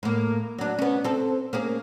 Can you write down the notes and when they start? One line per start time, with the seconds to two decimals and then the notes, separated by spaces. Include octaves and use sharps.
0.03 A2 A#3
0.58 F#3 D4
0.79 B3 C#4
1.04 C4 A4
1.53 A#3 C#4 G#4